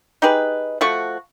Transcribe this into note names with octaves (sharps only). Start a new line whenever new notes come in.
D#4 G4 G#4 B4
F3 A3 F#4 C#6